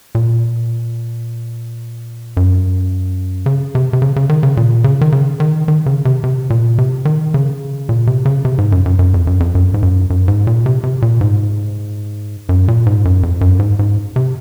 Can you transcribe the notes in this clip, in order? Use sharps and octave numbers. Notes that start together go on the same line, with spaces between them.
A#2
F#2
C#3
C3
C3
C#3
C#3
D#3
C#3
A#2
C#3
D#3
C#3
D#3
D#3
C#3
C3
C3
A#2
C3
D#3
C#3
A#2
C3
C#3
C3
G#2
F#2
F#2
F#2
F2
F#2
F2
F#2
G#2
F#2
F#2
G#2
A#2
C3
C3
A#2
G#2
F#2
A#2
G#2
F#2
F2
F#2
G#2
G#2
C3